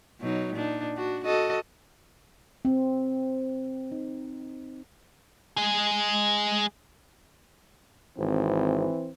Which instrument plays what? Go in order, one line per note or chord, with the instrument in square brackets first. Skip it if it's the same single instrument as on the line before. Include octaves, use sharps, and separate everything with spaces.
[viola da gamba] B2 F#3 D#4
A#2 D4 D#4
D4 F#4
F#4 A4 D#5
[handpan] C4
D#4
[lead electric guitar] G#3 G#4
[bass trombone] G#1 [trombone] E3 [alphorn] C4